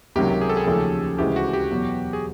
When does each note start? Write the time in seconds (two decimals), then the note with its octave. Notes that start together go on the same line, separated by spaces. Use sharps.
0.16 C#2 C3 D#3 F#3 A#3 G4
0.41 G#4
0.49 A4
0.57 G#4
0.67 D#2 C#3 F3 A3 C#4
1.18 D2 C#3 E3 G#3 G4
1.36 F#4
1.53 G4
1.71 E2 B2 F#3
2.13 G#4